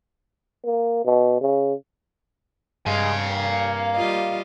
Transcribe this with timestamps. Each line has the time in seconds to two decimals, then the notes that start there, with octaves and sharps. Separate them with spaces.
0.65 A#3
1.05 B2
1.41 C#3
2.86 G2 G#3 F5 G#5
3.28 A#3
3.96 G3 F4 D#5